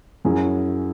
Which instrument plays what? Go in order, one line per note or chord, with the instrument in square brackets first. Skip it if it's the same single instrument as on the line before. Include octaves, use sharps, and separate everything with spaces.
[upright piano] F#2 F#3 C#4 E4 G#4